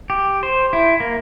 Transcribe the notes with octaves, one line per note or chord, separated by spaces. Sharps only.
G4
C5
E4
A#3